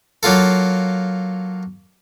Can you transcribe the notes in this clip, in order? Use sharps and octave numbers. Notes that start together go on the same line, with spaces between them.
F#3 A#3 F4 A4